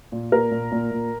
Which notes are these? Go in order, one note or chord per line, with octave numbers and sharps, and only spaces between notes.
A#2
A#2 A#4
A#2
A#2
A#2